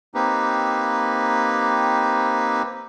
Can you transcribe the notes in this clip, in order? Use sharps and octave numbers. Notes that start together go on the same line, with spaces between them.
A#3 C4 D#4 G4 B4